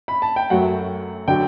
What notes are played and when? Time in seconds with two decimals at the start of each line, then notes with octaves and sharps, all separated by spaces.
0.08 B5
0.22 A5
0.36 G5
0.50 F#2 F#3 A3 F#5
1.28 D3 F#3 G5